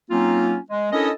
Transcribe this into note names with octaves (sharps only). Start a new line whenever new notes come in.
F#3 A#3 C4 C#4 D#4 F4
G#3
C#4 D4 E4 A4 A#4 D#5